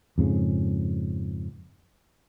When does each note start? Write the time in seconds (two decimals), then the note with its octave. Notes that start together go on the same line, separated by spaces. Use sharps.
0.18 F2 G#2 C#3